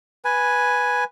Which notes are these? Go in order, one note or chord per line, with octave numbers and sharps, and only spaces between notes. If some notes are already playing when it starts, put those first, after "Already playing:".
B4 G#5